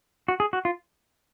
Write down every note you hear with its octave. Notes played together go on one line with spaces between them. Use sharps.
F#4
G#4
F#4
F4